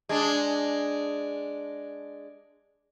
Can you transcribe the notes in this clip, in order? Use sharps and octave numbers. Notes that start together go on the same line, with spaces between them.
G#3 D4